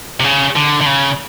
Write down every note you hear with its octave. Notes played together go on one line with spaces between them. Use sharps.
C3
C#3
D3
D3
C#3